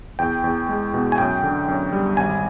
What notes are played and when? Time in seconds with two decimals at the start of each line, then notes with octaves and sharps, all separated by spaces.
0.19 E2 G5
0.44 E2
0.69 G#3
0.94 B2
1.12 G#5
1.18 F#2 G5
1.43 D3
1.68 F#2
1.93 G3
2.17 G#1 G#5